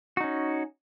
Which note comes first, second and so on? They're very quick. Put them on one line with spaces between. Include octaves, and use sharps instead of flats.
F#4 D#4 C#4